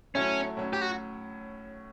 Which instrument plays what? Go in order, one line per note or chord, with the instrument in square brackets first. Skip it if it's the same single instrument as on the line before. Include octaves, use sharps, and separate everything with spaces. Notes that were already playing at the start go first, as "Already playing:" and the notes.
[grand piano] A2 F#3 A3 E4 [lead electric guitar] C#4
[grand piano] A2 F#3 C#4
[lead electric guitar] G4
F#4